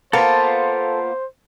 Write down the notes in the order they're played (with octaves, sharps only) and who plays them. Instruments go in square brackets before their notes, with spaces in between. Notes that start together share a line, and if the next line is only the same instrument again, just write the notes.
[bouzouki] A#3 B3 F4 [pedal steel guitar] A4 A5 [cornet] C5